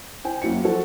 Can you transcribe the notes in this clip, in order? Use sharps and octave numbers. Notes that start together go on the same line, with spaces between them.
E4 C5 G5 G#5
F#2 A#3 E4 F#4 C#7
F3 F#4 A4 C5